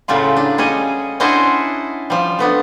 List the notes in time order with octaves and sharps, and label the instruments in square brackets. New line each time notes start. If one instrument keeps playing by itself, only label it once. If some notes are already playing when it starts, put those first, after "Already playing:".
[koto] A2 C#3 F#3 G3 F4
D4
G3 C#4 G#4 D#5
C#4 D4 E4 F#4 C5 D#5
F3 G3
A3 B3 D4